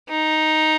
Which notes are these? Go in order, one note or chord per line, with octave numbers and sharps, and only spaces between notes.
D#4